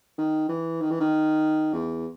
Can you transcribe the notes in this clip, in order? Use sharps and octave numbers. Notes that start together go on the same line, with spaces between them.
D#3
E3
D#3
E3
D#3
E2